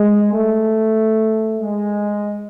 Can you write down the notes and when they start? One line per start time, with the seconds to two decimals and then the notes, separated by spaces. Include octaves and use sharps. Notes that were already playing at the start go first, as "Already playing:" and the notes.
Already playing: G#3
0.32 A3
1.59 G#3